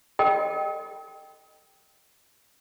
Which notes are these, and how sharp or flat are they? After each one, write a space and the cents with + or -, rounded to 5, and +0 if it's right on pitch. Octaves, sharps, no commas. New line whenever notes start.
A4 +35 D#5 -20 G5 +0